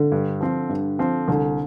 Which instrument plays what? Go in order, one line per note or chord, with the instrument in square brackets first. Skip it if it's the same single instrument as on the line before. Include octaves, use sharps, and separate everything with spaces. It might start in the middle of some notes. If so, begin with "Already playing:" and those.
Already playing: [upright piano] D3
[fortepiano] G2
F3 C4
G2
F3 C4
[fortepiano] C2 [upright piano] D3